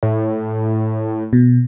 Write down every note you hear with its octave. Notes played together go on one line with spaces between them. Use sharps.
A2
B2